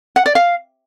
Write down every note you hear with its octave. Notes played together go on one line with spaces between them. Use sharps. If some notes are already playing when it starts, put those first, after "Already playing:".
F#5
D5
F5